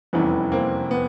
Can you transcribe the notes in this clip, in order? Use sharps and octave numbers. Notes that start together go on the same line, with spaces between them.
F1 E2 C3 E3 G3 B3 C#4
A#3 C4
B3